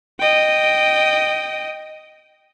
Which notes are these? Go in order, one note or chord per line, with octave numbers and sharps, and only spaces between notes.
D#5 G5